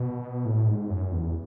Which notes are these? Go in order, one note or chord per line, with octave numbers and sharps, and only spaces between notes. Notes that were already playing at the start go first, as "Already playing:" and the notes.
Already playing: B2
A2
G#2
F#2
E2